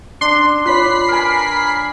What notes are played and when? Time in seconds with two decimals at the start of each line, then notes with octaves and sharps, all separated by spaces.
0.21 D4 C6
0.66 F4 B4 C#5 B5 B6 C7
1.09 A#4 G#5